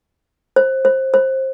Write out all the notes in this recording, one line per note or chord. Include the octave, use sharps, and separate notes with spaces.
C5
C5
C5